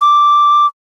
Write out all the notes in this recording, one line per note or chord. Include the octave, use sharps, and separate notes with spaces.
D6